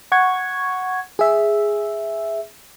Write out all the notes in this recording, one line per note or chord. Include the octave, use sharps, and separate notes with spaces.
F#5 C#6 G#6
G#4 E5